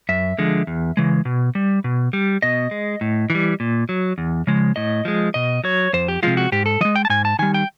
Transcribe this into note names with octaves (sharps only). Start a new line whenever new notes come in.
F#2 E5
D3 F3 G#3
E2
C#3 E3 G#3
B2
G3
B2
G3
B2 D#5
G#3
A2
E3
G3
A#2
F#3
E2
C#3 F3 G#3
A2 D#5
F3 G#3
B2 D#5
F#3 C#5
F2 C5
G4
C3 F3 G#3 F4
F#4
G#2 G4
A4
F3 G#3 D#5
G5
A5
G#2 G#5
A5
D#3 G3 G#5
G5